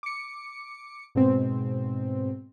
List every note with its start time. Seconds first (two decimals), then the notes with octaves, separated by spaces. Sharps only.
0.03 D6 C#7
1.15 G#2 B2 C4